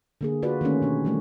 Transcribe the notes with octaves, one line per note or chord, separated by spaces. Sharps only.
D3 A#3 G#4
F4 F#4 B4 D5
D#3 A3 A#3 C#4
B2 D4 G4
E3 G3 A3